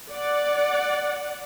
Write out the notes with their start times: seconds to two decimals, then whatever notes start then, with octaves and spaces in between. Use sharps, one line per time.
0.12 D5 F#5